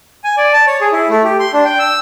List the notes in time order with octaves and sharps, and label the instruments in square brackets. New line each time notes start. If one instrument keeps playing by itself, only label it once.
[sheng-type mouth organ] G#5
D5
A5
C#5
G#4
E4
A3
G4
C6
D4
G5
E6